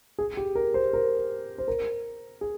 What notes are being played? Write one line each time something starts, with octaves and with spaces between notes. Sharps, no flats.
G#4
G4
A#4
C5
A#4
C5
A#4
G#4